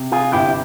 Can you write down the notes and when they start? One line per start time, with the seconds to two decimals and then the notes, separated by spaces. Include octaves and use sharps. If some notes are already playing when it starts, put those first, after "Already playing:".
Already playing: C3
0.12 F4 G#4
0.33 G1 E4 G4